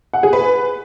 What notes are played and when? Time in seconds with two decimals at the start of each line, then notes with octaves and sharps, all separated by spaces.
0.14 F#5
0.23 G#4
0.33 B4